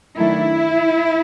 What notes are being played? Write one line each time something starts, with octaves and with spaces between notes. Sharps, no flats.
D#3 F#3 A3 D4 E4